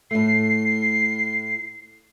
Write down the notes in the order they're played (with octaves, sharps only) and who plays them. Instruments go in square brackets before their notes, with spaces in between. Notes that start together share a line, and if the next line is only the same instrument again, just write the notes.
[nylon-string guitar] A2 A3 [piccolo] C7